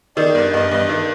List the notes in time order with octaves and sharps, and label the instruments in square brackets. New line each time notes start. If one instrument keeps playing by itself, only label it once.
[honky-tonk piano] D#3 [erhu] D5
[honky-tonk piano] G2
[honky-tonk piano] G2 [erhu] D#5
[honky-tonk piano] G2
D#3